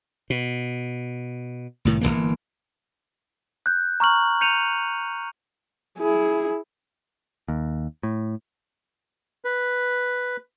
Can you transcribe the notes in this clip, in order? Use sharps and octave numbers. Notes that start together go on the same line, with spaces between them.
B2
C2 A2 D#3
G1 F#2 E3 A#3
F#6 G6
A#5 C#6 F6 F#7
G6 C#7 D#7 F7
E4 G#4
D#2
A2
B4